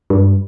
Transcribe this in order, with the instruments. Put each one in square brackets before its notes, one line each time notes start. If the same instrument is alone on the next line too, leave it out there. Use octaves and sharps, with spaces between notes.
[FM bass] G2